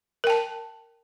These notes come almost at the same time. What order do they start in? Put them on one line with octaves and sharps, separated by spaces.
A#4 G5 A5